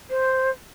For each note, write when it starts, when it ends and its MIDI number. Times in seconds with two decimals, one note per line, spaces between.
0.10 0.50 72